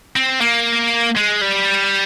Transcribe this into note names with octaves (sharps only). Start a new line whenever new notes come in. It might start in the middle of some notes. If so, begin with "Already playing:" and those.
C4
A#3
G#3
G3